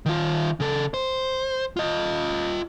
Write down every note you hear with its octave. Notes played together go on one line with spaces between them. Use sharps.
D#3 F4
C#3 A4
C5
F4 D#5